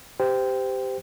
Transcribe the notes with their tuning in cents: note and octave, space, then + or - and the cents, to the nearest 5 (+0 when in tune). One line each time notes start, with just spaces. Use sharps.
G4 +0 C5 -25 G5 +0